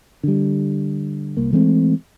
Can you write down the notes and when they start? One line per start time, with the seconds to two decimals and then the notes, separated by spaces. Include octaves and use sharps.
0.23 D3 G3
1.37 C2 A#3
1.52 E3 G#3 A3 C4